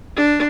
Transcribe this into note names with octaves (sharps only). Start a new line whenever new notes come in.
D4